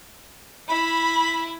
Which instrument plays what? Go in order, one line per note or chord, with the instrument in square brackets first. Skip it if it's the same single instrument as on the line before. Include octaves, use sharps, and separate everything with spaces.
[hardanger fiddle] E4 [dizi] B5